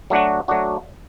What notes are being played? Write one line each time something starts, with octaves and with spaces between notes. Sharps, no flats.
F#3 A3 D4 F#4
F#3 A3 D4 F#4